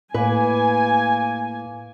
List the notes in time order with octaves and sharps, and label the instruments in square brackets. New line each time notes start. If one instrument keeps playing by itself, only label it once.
[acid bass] A2 [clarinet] A#3 [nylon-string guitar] B4 [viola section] G#5